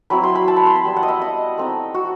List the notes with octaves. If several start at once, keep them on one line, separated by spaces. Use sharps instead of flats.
F#3 C4 E4 B5
C6
B5
A5
B5
C6
B5
G3 B3 E4
F#5
D#5
E5
D#5
A3 C4 D#4
F#4